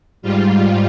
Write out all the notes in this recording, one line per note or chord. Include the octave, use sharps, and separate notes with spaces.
G#2 G3 F4